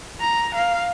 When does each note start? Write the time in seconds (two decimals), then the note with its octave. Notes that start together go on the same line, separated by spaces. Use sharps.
0.21 A#5
0.55 F5